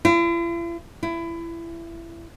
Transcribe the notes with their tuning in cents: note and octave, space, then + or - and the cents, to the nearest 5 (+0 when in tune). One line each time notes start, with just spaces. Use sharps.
E4 +45
E4 +25